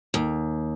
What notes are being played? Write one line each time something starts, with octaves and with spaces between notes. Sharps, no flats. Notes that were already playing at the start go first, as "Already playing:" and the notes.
D#2